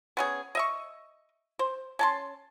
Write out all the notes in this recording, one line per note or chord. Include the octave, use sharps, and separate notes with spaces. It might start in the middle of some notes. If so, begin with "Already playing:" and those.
B3 C#4 G#4
D#5 E5 C#6
C5
C#4 A5 C6